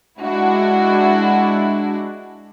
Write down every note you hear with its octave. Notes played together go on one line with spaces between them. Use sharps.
G#3 D4 E4 F#4